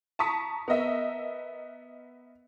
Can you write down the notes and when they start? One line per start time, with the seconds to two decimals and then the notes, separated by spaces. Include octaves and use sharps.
0.19 A5 A#5 C#6 D#6 B6
0.68 B3 A#4 D#5 E5